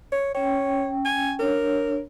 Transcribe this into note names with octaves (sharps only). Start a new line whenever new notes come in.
C#5
C#4 C#5 G5
G#5
D4 A#4 C#5